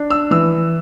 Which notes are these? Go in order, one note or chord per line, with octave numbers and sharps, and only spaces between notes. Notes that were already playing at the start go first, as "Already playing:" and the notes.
Already playing: D4
E6
E3 E6